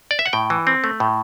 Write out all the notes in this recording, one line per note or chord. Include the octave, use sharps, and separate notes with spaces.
D5
E5
F#5
A2 G5
E3
C4
A3
A2